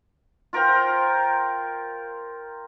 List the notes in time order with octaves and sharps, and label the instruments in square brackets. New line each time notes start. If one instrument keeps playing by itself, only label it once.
[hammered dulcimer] F4 A#4 C5 G5